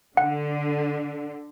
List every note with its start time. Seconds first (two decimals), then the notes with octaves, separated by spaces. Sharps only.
0.17 D3 F#5